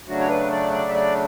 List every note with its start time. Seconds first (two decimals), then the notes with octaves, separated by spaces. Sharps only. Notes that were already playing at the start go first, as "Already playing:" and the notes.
0.08 C#3 F#3 A3 D4 F#4
0.20 C#5
0.29 B4
0.52 D5
0.72 D5
0.88 E5
0.94 D5